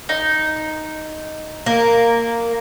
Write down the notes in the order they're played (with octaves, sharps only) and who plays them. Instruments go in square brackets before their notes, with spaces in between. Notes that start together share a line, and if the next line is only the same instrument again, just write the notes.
[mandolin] D#4
[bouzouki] A#3